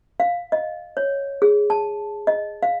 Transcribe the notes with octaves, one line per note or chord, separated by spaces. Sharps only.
F5
D#5
C#5
G#4
A5
D#5
F5